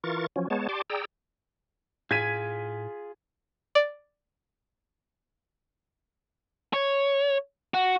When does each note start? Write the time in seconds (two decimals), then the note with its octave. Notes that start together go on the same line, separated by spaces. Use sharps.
0.04 E3 F4 A#4 C#6 A6
0.36 F3 F#3 C#4
0.50 G#3 B3 C#5 A5
0.69 G4 D5 A5 C6 D6
0.90 G#4 D5 G5 A#5 E6
2.11 A2 F4 G#4 G#6 B6 D#7
3.75 D5
6.73 C#5
7.74 F#4